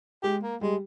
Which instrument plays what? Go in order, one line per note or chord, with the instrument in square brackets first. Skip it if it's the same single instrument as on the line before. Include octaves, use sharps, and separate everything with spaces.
[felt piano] G#3 [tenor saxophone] G4
[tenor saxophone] A#3
[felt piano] G3 [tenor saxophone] G#3